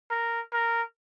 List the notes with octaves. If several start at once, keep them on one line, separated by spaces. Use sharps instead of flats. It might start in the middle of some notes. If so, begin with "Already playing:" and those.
A#4
A#4